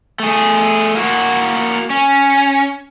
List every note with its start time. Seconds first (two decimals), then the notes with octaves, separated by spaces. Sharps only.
0.20 A3 G#4
0.95 A#3 F#4
1.90 C#4